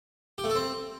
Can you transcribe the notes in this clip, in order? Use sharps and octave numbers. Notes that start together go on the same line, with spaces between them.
G4
A3
A4
C4